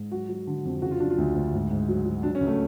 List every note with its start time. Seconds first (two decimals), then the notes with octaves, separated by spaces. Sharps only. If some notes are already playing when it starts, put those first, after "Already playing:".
Already playing: G#2
0.12 F#3 F#4
0.29 F#3
0.47 D3
0.65 F2
0.82 C#3 F#4
0.91 F4
1.00 F#3 D4
1.10 F4
1.18 D2
1.36 D2
1.54 G#2
1.71 G#2
1.89 F#3
2.05 F#3
2.23 F#3 D4
2.35 C#4
2.41 C#2
2.47 A3